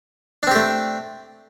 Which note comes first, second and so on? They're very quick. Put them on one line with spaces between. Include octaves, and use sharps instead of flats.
D4 C4 G4 A3